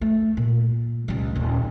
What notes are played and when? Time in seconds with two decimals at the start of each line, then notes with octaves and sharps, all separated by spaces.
0.01 A3
0.37 A#2
1.08 C#2 G3
1.35 D#1 C#4